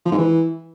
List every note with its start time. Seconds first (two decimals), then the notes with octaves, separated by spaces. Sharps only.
0.05 F3
0.11 G#2
0.18 E3